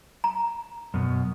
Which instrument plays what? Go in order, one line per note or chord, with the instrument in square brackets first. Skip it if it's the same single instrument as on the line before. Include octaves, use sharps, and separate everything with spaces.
[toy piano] A#5
[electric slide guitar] F#2 B2